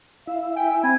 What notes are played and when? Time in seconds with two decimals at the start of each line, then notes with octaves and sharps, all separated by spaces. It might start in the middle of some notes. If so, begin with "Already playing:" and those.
0.27 E4 E5 F5
0.56 G5 G#5
0.83 C4 G#5 B5